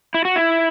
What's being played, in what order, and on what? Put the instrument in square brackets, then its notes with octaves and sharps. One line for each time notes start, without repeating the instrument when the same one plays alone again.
[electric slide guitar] E4
F#4
E4